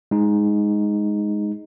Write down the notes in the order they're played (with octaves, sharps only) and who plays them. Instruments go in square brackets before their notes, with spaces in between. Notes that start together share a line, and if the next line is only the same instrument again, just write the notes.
[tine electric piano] G#3 D#4